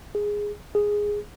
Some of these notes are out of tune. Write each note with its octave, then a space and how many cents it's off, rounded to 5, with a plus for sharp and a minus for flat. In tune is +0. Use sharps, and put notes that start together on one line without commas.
G#4 -5
G#4 -5